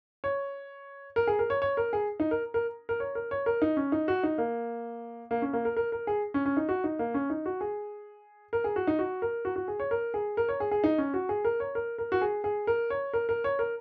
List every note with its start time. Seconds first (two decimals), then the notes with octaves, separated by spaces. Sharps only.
0.24 C#5
1.16 A#4
1.27 G#4
1.39 A#4
1.50 C#5
1.62 C#5
1.77 A#4
1.93 G#4
2.20 D#4
2.31 A#4
2.54 A#4
2.89 A#4
3.00 C#5
3.15 A#4
3.31 C#5
3.46 A#4
3.62 D#4
3.77 C#4
3.92 D#4
4.08 F#4
4.23 D#4
4.38 A#3
5.31 A#3
5.42 C#4
5.53 A#3
5.65 A#4
5.77 A#4
5.92 A#4
6.07 G#4
6.34 C#4
6.46 C#4
6.57 D#4
6.69 F#4
6.84 D#4
6.99 A#3
7.14 C#4
7.30 D#4
7.46 F#4
7.61 G#4
8.53 A#4
8.64 G#4
8.76 F#4
8.87 D#4
8.99 F#4
9.22 A#4
9.45 F#4
9.56 F#4
9.68 G#4
9.80 C#5
9.91 A#4
10.14 G#4
10.37 A#4
10.49 C#5
10.60 G#4
10.71 G#4
10.84 D#4
10.98 C#4
11.14 F#4
11.29 G#4
11.45 A#4
11.60 C#5
11.75 A#4
11.98 A#4
12.12 F#4
12.22 G#4
12.44 G#4
12.67 A#4
12.90 C#5
13.13 A#4
13.29 A#4
13.44 C#5
13.59 A#4